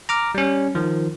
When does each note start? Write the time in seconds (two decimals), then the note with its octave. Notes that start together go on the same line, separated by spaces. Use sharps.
0.09 A#5 D6 F6
0.35 G3 C#4
0.75 D#3 F3